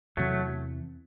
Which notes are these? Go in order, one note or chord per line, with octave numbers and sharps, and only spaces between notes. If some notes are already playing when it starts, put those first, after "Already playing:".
E2 C3 E3 F#3 A3